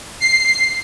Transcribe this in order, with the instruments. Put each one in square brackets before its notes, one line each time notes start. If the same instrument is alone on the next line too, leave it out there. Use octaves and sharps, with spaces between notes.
[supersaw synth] C7